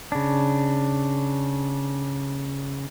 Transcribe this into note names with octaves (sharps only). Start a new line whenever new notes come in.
C#3 D4